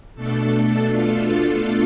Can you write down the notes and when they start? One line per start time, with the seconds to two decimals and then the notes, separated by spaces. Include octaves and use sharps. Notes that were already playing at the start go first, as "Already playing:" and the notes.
0.15 B2 A3 D4 A4
0.91 F4